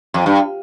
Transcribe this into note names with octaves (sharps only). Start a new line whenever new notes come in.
F2
G2